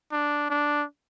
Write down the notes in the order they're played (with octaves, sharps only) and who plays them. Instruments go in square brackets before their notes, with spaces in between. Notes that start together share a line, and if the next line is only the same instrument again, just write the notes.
[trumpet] D4
D4